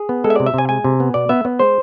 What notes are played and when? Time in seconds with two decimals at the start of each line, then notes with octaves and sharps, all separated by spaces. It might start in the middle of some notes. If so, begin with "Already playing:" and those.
Already playing: G#4
0.09 B3
0.24 G#3 A4
0.30 E5
0.36 C3 D5
0.46 E5
0.54 C3 G#5
0.69 G#3 G#5
0.84 C3
1.00 B3
1.14 B2 D5
1.29 B3 E5
1.45 B3
1.59 G#3 C5